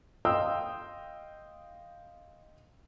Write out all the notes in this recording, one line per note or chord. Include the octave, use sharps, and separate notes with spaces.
D#5 F5 G5 C6 D#6 E6